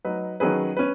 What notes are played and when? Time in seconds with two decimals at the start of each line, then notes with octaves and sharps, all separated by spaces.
0.05 F#3 D#4 B4
0.40 D#3 F#3 C#4 G#4 B4
0.77 C#4 B4